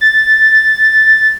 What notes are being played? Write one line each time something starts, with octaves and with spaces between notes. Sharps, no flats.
A6